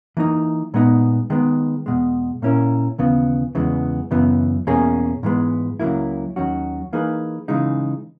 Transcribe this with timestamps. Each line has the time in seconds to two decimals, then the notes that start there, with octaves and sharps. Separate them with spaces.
0.17 E3 A#3 D#4
0.74 A#2 G#3 B3 D#4
1.30 D#3 G#3 B3
1.86 E2 B2 G#3
2.42 A#2 A#3 C#4 E4 A#4
2.98 D#2 C#3 E3 B3
3.55 E2 C#3 E3 G#3 B3
4.11 F#2 C#3 E3 B3
4.67 E2 B2 A#3 C#4 G#4
5.23 G#2 E3 G#3 B3
5.80 C#2 C#3 F#3 A#3 E4
6.36 D#2 D#3 F#3 C#4 F#4
6.93 E3 A#3 D#4 G#4 B4
7.48 C#3 E3 G#3 D#4